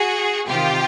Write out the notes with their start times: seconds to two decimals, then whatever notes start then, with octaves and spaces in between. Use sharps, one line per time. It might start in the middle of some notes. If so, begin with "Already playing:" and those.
Already playing: F#4 G#4
0.47 C3 D#3 F4 G4